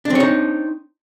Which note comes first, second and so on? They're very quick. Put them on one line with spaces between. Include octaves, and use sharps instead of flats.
D4 C4 C#5 D#4